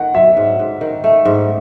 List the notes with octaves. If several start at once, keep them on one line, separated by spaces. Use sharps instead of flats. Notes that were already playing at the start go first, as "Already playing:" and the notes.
Already playing: D#3 F#5
F#3 E5
G#2
G#2
D#3
A3
G#2